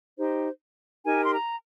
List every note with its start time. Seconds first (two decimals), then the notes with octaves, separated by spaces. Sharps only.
0.17 D#4 G4 C5
1.05 D#4 G4 A#4 G#5
1.25 C6
1.35 A#5